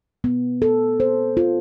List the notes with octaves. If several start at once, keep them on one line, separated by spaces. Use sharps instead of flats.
B3
A4
C5
F4